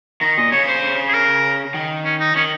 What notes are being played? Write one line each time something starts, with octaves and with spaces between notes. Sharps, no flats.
D#3 A#5
A#2 D#5
C#3 C#5
C5
G#4
A#4
D#3
C#4
D#4
D#3 C#4